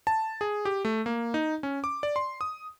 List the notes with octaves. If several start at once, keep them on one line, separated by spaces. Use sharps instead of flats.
A5
G#4
G4
A3
A#3
D#4
C#4
D6
D5
C6
D#6